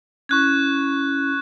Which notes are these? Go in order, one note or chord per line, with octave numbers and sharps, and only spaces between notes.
C#4 E4 C#6 F#6 G#6